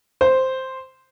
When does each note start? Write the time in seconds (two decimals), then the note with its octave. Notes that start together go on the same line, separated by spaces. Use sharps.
0.21 C5